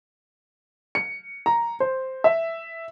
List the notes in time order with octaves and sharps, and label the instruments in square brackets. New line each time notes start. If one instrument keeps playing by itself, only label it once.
[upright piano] C#7
A#5
C5
E5